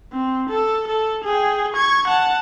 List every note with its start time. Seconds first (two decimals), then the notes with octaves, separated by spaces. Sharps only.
0.13 C4
0.50 A4
0.88 A4
1.24 G#4 G5
1.73 C#6 G#6
2.07 F#5 A5